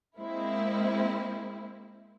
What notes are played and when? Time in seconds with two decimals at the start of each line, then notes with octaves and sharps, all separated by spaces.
0.18 G#3 A#3 C4 E4